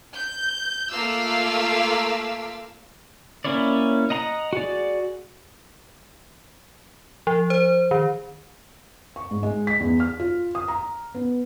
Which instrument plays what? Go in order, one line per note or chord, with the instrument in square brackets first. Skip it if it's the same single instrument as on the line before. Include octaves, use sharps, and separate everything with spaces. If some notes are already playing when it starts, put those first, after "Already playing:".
[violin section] G6
A3 A#3 F4 F5 D6 E6
[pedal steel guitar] A#3 C#4 E4 C#5 D5
D#5 F#5 A#5 C6 D#6
F#4 G#4 D5
[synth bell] F3
C5
D#3
[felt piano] C#6
G#2
G#3
B6
E2
F6
F4
D#6
A#5
B3